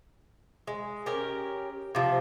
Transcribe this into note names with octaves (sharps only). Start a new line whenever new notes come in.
G#3
C#4 G4 A#4
C3 F3